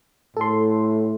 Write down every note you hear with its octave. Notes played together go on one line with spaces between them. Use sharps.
A2 A4 C6